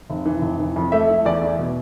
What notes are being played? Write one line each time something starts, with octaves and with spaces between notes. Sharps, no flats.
F1
E3
F1
E3
F2
A3 E5
E4
E2 D5
E4
B2